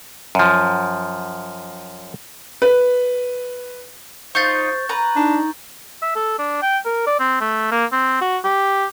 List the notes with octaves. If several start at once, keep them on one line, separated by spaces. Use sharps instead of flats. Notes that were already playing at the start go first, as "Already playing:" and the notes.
F#2 F3
B4
D#4 F4 C5 C#6 G6 A6
B4 A#5
D4 D#4
E5
A4
D4
G5
A#4
D5
C4
A3
A#3
C4
F#4
G4